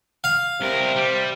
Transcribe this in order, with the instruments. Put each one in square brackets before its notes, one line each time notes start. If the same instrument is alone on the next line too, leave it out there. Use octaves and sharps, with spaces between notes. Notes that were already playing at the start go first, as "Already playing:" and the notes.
[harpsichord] F5
[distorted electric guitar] C2 A#4 [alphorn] C3
[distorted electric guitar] G3